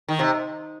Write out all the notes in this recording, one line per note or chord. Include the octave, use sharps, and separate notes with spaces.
D#3
C3